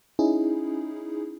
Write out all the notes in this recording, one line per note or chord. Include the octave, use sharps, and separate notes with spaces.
C#4 D#4 E4 G#4